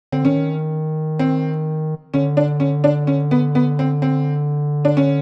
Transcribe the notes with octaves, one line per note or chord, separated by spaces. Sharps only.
D3 C4
D#3 C#4
C4
D3 C#4
D4
C#4
D4
C#4
B3
B3
C4
C4
D4
C#4